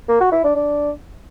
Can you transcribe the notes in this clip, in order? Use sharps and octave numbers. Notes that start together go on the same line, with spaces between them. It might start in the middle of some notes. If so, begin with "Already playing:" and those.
A#3
F#4
E4
D4
D4